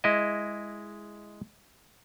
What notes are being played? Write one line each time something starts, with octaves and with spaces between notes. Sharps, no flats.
G#3 E4 D#5